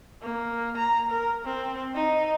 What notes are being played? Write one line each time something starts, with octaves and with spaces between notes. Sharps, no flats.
A#3
A#5
A#4
C4
D#4